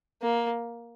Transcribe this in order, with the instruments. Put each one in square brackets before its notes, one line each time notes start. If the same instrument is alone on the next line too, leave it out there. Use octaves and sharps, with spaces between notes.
[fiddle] A#3